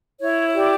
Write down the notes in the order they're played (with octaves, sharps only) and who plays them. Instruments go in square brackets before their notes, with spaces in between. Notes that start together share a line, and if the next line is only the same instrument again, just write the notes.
[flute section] E4 C#5
G4 D5